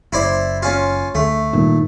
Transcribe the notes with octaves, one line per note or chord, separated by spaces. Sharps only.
F#1 E4 C5 D5
C#4 F4
D2 A3
G2 A#2 D#3